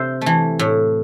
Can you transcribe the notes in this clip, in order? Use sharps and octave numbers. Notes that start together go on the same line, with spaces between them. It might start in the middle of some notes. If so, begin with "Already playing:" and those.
Already playing: C3 C5 E5
E3 A3
A2